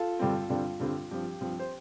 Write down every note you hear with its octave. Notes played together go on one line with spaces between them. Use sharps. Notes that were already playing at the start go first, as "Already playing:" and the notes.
Already playing: F4 A4
G2 D3 G3 C4
G2 D3 G3 C4 F4
G2 D3 G3 C4
G2 F3 C4 G4
G2 F3 C4
C5